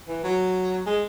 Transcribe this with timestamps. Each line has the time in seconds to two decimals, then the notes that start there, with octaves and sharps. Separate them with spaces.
0.09 E3
0.24 F#3
0.86 G#3